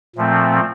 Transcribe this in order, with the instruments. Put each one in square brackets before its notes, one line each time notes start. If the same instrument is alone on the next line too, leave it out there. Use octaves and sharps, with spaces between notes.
[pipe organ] A#2 F3 A3 C4